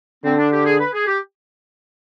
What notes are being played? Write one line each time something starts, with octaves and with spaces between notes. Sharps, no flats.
D3 C4
D4
G4
G#4
B4
G#4
G4